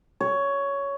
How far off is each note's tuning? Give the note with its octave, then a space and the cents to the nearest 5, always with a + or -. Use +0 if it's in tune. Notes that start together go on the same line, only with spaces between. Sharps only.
C#5 +10